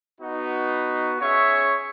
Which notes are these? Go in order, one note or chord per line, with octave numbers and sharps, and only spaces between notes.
B3 D#4 F#4
C#4 G#4 C#5 E5 C#6